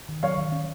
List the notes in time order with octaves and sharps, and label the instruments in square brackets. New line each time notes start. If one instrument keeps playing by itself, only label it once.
[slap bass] D#3
[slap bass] F#3 [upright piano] C#5 F5
[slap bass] D#3
C#4